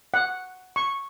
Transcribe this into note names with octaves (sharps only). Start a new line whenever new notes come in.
F#5
C#6